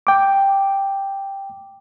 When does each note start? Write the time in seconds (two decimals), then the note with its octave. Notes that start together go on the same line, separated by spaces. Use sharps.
0.07 G5 D6